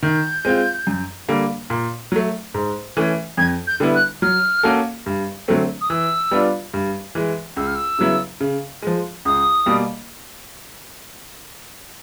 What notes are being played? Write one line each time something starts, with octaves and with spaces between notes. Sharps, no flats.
D#3 G6
G#3 C4 F4
F#2
D3 G3 A#3
A#2
F#3 A3
G#2
E3 A3 C#4
F2 G#6
G6
D3 G3 B3 E4
F#6
F#3 F6
A#3 C#4 F#4 A4
G2
D3 F#3 A3 C4
D#6
E3 E6
G3 B3 D4 F4
G2
E3 G#3
C#2 E6
F6
E6
C#3 F#3 B3 E4
C#3
F3 G#3
C#2 D#6
B2 G3 A#3